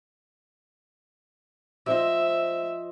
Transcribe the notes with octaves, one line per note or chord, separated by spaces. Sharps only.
F3 C5 D#5 E5